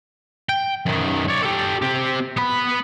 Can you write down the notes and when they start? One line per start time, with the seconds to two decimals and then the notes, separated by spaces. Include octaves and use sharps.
0.49 G5
0.86 F#2 D#3
1.28 C#5 D5
1.43 G4 A4
1.82 C4 G4
2.37 B3 B5